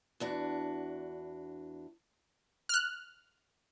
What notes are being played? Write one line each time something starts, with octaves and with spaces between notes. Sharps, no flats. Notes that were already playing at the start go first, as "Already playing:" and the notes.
E2 D4 F#4
F6 F#6